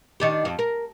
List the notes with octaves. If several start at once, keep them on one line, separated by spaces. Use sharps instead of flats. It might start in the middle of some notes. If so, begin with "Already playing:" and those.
D#3 D4 G4
F2
A#4